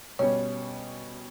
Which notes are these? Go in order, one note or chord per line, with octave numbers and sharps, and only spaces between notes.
B2 G3 C#4 C#5